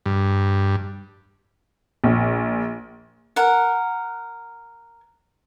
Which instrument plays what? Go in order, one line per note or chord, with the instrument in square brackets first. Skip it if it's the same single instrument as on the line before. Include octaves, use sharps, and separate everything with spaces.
[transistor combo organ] G2
[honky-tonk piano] A#1
[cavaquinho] A#4 F#5